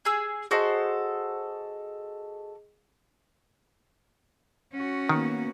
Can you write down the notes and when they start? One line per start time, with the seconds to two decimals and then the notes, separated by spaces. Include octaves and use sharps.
0.05 G#4 E6
0.51 F#4 G#4 A4 C5 D#5
4.73 C#4 F#4
5.09 D#3 A#3 B3